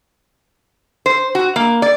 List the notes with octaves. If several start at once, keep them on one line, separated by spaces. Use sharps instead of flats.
C5
F#4
A#3
D5